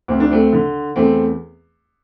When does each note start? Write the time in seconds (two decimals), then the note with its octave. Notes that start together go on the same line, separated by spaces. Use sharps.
0.08 D2 C4
0.20 D4
0.31 A3 C4
0.53 D3
0.96 E2 A3 C4